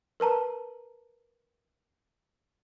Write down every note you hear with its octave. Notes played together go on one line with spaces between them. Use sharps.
A#4 B4 A5 A#5